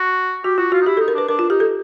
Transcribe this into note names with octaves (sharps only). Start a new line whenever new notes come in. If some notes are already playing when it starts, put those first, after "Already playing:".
Already playing: F#4
F#4 G4
F4 F#4
F4 F#4
D#4
E4 G4
D#4 A4
A#4
D4 B4
D4 A#4
F4
D#4 G4
A4